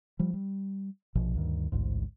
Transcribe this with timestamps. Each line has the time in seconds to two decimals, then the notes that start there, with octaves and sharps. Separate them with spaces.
0.19 F3 G3
0.34 G3
1.15 A#1 B2 F3
1.34 D2 G2 D#3
1.72 A1 D2 G#2